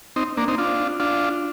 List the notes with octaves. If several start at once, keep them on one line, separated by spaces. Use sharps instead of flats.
C4 D#4
A#3 D4
C4 D#4
D4 F4
D4 F4